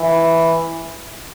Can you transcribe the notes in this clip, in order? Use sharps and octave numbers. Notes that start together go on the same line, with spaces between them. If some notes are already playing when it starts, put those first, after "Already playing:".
Already playing: E3